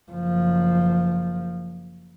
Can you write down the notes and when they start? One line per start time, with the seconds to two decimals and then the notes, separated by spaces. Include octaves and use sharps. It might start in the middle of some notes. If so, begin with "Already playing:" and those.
0.11 F#1 F3